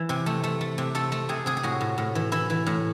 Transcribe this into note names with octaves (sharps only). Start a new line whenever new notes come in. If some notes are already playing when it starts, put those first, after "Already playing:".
Already playing: E3
C3
A3
A3
A3
C3
A3 A4
A3
C3 G#4
C3 G#4
G#4
A2 F#4
A2
A2
E3
E3 E4
E3
A2